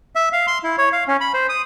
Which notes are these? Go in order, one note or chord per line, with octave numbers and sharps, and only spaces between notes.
E5
F5
C6
E4
C#5
F5
C#4
B5
C5
D#6